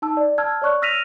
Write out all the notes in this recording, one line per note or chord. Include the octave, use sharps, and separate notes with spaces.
D#4 A5 E6
D5
A5 E6 F6 G#6
C#5 D5 C#6 F#6
E6 F6 A#6 B6 D#7 F7